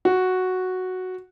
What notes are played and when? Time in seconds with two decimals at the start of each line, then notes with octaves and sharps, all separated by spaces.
0.05 F#4